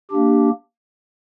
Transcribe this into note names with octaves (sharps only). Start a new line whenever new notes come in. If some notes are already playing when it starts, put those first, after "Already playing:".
A#3 D4 G4